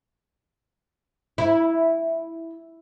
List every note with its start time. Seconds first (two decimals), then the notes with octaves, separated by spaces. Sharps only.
1.38 E4